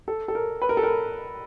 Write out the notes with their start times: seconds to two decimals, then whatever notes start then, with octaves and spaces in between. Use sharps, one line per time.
0.08 A4
0.28 A4
0.35 A#4
0.62 B4
0.69 A#4
0.77 A4
0.83 A#4